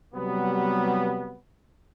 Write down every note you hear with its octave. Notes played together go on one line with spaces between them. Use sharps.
C3 F#3 G3 B3